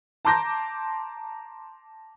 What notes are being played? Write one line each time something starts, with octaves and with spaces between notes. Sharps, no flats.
A5 A#5 C6 D6 G6 A#6